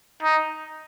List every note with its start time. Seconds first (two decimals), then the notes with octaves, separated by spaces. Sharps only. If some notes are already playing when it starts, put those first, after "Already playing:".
0.23 D#4